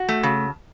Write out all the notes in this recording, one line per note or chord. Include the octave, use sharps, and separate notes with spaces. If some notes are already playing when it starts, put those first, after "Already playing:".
Already playing: F#4
A3
C#3